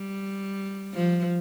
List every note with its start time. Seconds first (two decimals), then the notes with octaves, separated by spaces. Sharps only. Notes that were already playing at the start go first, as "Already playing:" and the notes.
Already playing: G3
0.94 F3